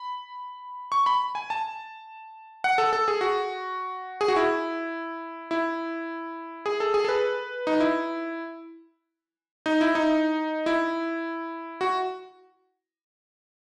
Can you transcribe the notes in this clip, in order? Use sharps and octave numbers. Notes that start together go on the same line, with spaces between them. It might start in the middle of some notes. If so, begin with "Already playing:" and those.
Already playing: B5
C#6
B5
G#5
A5
F#5
A4
A4
G#4
F#4
G#4
F#4
E4
E4
G#4
A4
G#4
A4
B4
D#4
E4
D#4
E4
D#4
E4
F#4